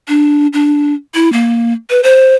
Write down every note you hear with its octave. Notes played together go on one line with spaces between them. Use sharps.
D4
D4
E4
A#3
B4
C5